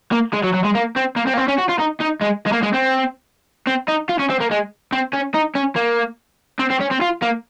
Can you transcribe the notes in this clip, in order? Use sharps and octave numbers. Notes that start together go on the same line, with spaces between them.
A#3
G#3
F#3
F#3
G#3
A#3
C4
A#3
C4
A#3
C4
C#4
F#4
F4
D#4
D#4
G#3
G#3
A#3
G#3
C4
C4
D#4
F4
C#4
C4
A#3
G#3
C4
C#4
D#4
C#4
A#3
C4
C4
C#4
C4
F4
A#3